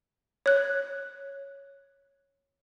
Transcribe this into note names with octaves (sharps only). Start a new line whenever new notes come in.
C#5 F#6